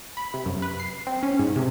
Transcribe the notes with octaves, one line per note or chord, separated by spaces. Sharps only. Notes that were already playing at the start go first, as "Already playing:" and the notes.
B5
C3
F#2
B4
C7
C4
C#4
G#2
C3